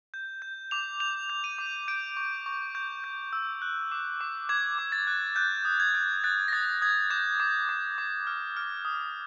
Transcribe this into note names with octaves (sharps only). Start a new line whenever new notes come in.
G6
G6
D6 F7
G6 F7
G6
D#7
D6
G6 D7
C#6
C#6
C#6 G6
G6
E6
F#6
D6
D6
D6 G#6
D6
A6
F#6
F#6 G6
D#6
G#6
F#6
F#6 A6
A#6
D#6 A6
D#6 G#6
D6 G6
D6
D6
D6
F6
F6
D#6